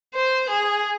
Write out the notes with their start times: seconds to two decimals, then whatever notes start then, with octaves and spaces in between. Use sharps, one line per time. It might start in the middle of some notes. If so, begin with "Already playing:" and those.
0.14 C5
0.49 G#4